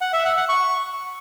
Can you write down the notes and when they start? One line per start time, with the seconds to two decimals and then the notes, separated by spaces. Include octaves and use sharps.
0.01 F#5
0.13 E5
0.25 F#5
0.37 F#5
0.49 C#6